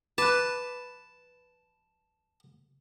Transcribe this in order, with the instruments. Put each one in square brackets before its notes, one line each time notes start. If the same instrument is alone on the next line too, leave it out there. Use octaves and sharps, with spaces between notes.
[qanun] B4 [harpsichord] A5 [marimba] D6 F#6